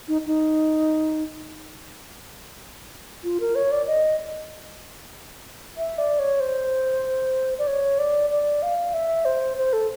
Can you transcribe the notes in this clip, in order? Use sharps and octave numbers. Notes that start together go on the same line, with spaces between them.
D#4
D#4
F4
A#4
C#5
D5
D#5
E5
D5
C#5
C5
D5
C#5
D5
D5
F5
E5
C5
C5
A4